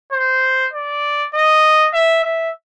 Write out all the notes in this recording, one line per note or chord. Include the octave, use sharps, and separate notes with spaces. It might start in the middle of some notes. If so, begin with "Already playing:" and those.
C5
D5
D#5
E5
E5